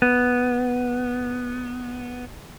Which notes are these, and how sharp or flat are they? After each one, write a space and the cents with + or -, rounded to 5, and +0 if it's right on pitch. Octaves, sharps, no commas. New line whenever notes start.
B3 -5